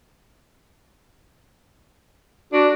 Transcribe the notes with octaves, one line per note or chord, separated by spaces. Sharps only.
D4 F#4